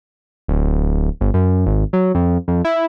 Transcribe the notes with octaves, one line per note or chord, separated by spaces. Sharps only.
D1
G1
F#2
G#1
F#3
F2
F2
E4